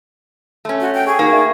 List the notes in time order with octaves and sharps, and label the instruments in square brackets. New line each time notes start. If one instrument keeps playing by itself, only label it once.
[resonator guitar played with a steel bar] A3 C#4
[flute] F#4
G5
[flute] G#4 [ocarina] C#6
[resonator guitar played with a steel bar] A#3 [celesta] D#4 F#4 C#7
[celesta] D5 E5 F5